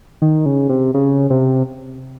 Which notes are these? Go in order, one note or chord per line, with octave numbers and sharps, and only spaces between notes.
D#3
C#3
C3
C#3
C3